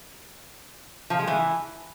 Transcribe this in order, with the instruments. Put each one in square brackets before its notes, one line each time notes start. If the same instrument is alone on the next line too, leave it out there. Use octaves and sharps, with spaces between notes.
[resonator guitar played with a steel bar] F3
G#3
E3